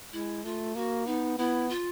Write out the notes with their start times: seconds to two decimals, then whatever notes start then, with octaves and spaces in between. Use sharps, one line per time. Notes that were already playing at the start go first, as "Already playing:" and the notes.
0.13 G#3 E4
0.44 A3 F4
0.75 A#3 F#4
1.07 B3 D#4
1.38 B3 E4
1.70 F4